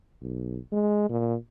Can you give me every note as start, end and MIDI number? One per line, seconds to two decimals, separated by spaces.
0.22 0.58 35
0.72 1.08 56
1.10 1.35 46